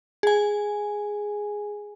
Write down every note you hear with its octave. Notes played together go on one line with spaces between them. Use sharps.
G#4 G#5